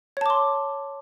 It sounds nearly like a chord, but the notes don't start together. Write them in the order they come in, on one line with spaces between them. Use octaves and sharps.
C#5 A5 D6 C6